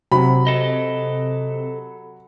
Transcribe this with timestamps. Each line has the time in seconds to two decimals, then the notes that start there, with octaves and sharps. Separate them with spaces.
0.12 C3 F#3 B5
0.47 A4 D#5